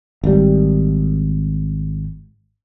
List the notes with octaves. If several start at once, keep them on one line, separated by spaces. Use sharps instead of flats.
G#1 G3